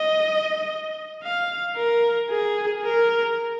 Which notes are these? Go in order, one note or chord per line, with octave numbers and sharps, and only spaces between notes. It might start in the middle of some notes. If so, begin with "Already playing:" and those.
Already playing: D#5
F5
A#4
G#4
A#4